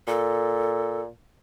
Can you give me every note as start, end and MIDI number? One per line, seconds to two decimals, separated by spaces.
0.07 1.08 46
0.07 1.01 69